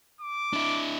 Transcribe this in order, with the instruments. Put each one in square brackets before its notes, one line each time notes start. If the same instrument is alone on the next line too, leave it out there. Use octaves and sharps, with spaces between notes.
[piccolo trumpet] D6
[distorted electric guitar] D4 E4